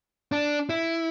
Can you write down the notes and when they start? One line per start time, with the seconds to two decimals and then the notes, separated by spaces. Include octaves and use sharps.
0.32 D4
0.70 E4